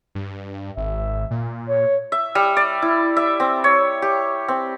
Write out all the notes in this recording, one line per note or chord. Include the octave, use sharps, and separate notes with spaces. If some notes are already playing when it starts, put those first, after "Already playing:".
G2
G#1 E5
A#2
C#5
E5
G3
D5
E4
E5
C4
C#5
G4
C4